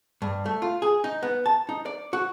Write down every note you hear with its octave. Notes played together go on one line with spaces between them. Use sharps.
G2
A3
F4
G#4
D#4
B3
A5
D#4
D5
F#4